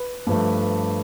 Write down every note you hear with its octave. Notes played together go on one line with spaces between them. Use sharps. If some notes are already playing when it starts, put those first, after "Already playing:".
Already playing: B4
G2 F3 A3